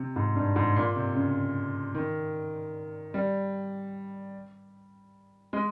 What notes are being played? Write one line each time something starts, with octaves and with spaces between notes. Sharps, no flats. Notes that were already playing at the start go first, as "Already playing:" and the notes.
Already playing: C3
G#2
G2
G#2
A#2
C3
C#3
D#3
G3
G#3